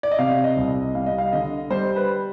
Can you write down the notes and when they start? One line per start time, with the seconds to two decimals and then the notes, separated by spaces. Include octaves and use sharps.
0.03 D5
0.11 D#5
0.18 C3 F5
0.44 D#5
0.57 C2
0.94 G3 F5
1.06 D#5
1.18 F5
1.33 D3 D#5
1.70 G3 C5
1.96 B4